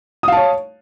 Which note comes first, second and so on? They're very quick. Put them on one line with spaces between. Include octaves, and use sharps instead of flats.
D#6 F5 A5 C#5